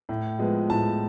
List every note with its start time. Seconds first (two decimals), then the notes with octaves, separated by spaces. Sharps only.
0.09 A2
0.39 F3 G#3 B3
0.70 A2 A5